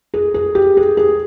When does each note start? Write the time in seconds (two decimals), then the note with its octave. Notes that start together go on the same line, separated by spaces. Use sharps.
0.14 G#4
0.34 G#4
0.55 G4
0.77 G#4
0.97 G#4